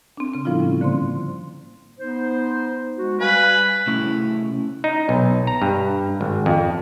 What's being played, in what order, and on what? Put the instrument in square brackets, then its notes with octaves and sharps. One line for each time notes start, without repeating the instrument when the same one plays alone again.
[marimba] C4 D4
C#3 C4
A2 F3 G3 B3 E4 F4
G3 C#4
G#2 D3 A#3 C5 C6
[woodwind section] B3 D#4 C5
G#3 F#4
[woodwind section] G3 F5 G#5 [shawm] B4
[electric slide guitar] C3 A3 C#4 E4
[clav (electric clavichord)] D#4
B1
A#5
G2
G#1
F2